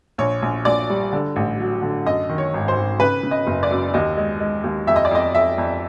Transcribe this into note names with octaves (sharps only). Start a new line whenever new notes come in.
A#1 C#5
A#1
A#1 D5
G3
D3
A1
F#3
D3
F#2 D#5
D#3
C#5
G#1
C5
G#1
C#3 B4
C#3
D#5
F#1
D5
F#2
D#2 D#5
G#3
G#3
D#2
F2 E5
D#5
D5
F2 D#5
F2 E5
F2